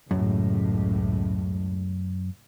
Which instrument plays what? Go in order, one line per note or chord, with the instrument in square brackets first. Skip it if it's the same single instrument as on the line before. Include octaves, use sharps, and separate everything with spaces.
[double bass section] C#2 A2 [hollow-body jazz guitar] F#2